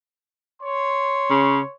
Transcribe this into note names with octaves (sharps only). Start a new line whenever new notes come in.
C#5 C6
C#3